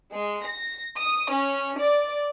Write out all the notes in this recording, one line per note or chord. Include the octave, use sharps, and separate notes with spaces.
G#3
A#6
D#6
C#4
D5